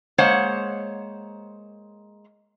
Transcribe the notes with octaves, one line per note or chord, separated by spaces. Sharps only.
G#3 A#3 C5 C#5 F#5